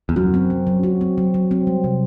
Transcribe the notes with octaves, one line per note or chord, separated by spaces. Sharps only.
E2
F#2 F#4
C4
F#3
F#3
F#4
C4
F#3
F#3
C4
G3
C3